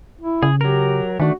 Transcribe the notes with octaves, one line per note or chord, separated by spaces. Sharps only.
E4
C#3 G#4
F#3 G4 A#4
D#3 A3 D4 F#4